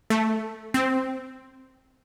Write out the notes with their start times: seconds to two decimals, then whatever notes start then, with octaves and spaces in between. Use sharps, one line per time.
0.10 A3
0.74 C4